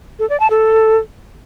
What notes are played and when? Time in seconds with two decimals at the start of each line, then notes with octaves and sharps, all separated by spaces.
0.19 A4
0.29 D5
0.40 A5
0.50 A4